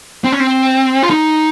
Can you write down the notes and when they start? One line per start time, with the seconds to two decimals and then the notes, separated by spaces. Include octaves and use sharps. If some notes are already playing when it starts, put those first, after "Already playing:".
0.24 C4
0.32 C#4
0.40 C4
1.03 F4
1.10 D#4